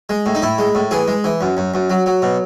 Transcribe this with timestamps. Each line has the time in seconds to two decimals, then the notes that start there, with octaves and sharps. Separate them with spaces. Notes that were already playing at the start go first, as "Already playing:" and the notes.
0.09 G#3
0.26 A2
0.35 D#4
0.42 A2 E4
0.58 G#3
0.75 A2
0.91 E3 G#4
1.08 G#3
1.24 E3
1.41 F#2
1.57 F#2
1.74 F#2
1.90 F#3
2.06 F#3
2.22 B2